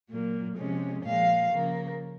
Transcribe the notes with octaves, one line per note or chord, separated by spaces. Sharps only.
A#2 F#3 A#3
C3 F3 G#3 C#4
A#2 F3 G#3 F5
C#3 F3 A#3